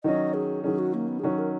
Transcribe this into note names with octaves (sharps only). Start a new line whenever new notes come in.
D#3 F#3 C#4 D#5
G#4
D#3 F#3 C#4 G#4
F#4
A#3
B3
G#4
D#3 F#3 C#4 F#4
A#4